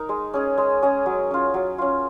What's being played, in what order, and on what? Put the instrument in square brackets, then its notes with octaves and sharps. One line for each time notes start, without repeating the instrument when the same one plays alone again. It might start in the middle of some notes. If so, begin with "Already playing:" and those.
Already playing: [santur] D#4 A#4
G#3
C#4 G#4 D#5
G#3
C#4 G#4 D#5
F#3
C#4 F4
F#3
C#4 F4